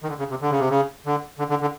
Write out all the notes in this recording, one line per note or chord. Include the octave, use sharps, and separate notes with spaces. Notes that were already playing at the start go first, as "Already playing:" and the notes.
D#3
D3
C#3
C3
D3
C#3
C3
C#3
D3
D3
D3
D3